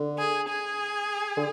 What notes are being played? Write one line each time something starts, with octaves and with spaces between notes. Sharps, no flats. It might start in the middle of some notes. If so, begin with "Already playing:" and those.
Already playing: D3
G#4
G#4
D3